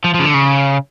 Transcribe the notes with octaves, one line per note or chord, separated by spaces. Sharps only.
F3
C#3 F3
D3
C#3